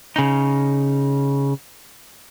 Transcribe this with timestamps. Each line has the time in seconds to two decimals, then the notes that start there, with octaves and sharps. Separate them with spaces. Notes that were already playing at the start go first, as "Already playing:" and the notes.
0.16 C#3 D#4